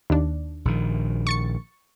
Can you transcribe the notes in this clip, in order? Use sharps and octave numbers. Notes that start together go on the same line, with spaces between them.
D#2 D4
A#1 D#3
C#6 A6 C#7